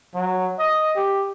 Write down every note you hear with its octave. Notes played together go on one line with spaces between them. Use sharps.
F#3
D#5
G4